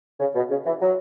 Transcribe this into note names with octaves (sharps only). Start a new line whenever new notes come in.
C#3
B2
C#3
E3
F#3